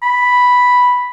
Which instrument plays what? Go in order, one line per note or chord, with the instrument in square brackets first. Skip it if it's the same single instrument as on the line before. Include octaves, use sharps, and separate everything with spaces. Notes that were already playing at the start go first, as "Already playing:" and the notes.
[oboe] B5